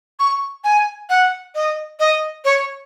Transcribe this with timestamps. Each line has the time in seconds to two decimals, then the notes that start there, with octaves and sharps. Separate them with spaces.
0.19 C#6
0.64 G#5
1.10 F#5
1.55 D#5
2.00 D#5
2.45 C#5